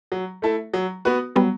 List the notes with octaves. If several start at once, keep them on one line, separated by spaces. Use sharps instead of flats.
F#3
A3 E4 A4 E5
F#3
B3 F#4 B4
F#3 G3 B3